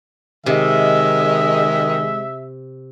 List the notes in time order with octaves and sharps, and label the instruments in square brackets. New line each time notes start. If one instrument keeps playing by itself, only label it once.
[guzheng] C3 [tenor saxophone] D#3 [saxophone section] G#3 [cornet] E5